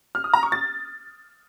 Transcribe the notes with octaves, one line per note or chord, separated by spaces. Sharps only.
F6
D#6
A#5
C#6
A6